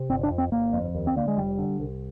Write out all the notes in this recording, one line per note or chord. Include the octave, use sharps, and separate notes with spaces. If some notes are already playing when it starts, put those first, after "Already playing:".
Already playing: C3
G1 C4
D4
F2
C4
G1 A#3
F2
D#2
C4
D3 A#3
G#3
F1 G3
D3
C2